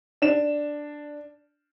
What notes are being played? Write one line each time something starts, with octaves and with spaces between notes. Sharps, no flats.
D4 E7